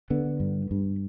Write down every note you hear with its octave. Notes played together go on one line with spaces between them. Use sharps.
D3 B3
G2
G2